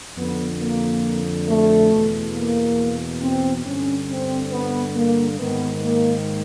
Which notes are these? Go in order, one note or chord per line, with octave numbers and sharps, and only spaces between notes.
F2 D3 B3
A#3
A3
E2 B2
A#3
C4
G2 D3 C#4
C4
B3
A#3
G#2 D#3 B3
A#3